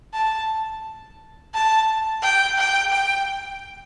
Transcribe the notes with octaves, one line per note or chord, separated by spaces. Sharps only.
A5
A5
G5
G5
G5